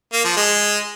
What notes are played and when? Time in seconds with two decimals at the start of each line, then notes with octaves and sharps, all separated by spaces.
0.12 A#3
0.24 F3
0.36 G#3